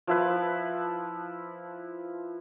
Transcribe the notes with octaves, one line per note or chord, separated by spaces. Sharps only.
F3 E4 B4